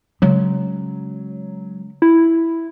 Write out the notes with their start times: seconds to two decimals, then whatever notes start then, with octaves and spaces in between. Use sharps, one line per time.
0.22 C#3 F#3 G#3
2.02 E4